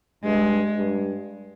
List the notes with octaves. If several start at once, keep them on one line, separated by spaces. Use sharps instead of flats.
G2 G#3
G2